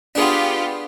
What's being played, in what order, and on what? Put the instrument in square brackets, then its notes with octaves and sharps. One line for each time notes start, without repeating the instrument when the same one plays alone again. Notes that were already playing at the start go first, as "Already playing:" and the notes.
[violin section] B3 F4 G4 [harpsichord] D4 G#4